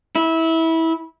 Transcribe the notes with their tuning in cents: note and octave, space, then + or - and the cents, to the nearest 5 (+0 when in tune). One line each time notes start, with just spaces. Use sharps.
E4 -20